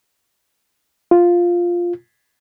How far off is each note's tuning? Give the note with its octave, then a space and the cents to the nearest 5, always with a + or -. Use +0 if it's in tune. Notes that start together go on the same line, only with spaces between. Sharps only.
F4 +0